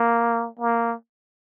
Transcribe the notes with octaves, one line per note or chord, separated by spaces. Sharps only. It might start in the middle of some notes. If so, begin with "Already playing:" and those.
Already playing: A#3
A#3